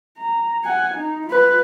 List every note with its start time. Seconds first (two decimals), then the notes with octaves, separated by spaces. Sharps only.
0.18 A#5
0.64 F#5 G#5
0.94 D#4
1.27 F4 B4